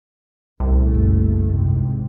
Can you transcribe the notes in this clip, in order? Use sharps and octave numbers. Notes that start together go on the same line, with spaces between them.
C2 A#2 C#3 A3
F#1
G#1 G#2 C3